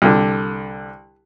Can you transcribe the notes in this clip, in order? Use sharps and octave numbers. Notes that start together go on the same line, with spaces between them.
C2 D3